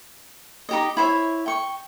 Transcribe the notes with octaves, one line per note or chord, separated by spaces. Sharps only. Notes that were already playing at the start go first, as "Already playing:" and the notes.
D#4 G4 D#5
E4 C5 C#5 E5
G5 C#6